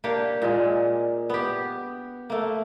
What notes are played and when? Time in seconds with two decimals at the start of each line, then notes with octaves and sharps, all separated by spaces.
0.04 A#3 D4 G4 C#5
0.42 A#2 G#3
1.30 B3 G4
2.30 A3 A#3